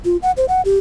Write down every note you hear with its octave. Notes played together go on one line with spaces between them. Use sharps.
F4
F#5
C5
F#5
G4